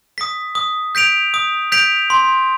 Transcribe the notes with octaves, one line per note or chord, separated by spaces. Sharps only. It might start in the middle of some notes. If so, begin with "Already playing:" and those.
D#6 B6
D#6
G6 B6 D7 F7
D#6
G6 B6 D7 F7
C6